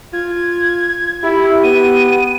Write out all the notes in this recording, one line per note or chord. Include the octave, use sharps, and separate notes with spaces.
F4 G#6
E4 G4
B3 D#7